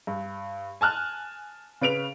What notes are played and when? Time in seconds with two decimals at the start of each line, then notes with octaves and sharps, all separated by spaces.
0.07 G2
0.81 G#5 A5 F6 F#6
1.81 C#3 B4 D7 F7